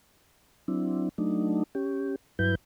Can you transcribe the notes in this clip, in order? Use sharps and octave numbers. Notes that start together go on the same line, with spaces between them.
F#3 C4 D4 E4
F#3 A3 D4 D#4
C#4 G4
G2 F#3 E4 B4 G6